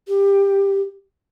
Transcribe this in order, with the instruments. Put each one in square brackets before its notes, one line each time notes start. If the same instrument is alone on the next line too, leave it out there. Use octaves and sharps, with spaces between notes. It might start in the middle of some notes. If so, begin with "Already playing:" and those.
[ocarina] G4